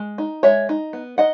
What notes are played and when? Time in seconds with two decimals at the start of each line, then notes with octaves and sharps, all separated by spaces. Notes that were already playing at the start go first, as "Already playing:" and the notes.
Already playing: G#3
0.18 D#4
0.43 G#3 C#5 E5
0.69 D#4
0.93 B3
1.18 D#4 D#5 F#5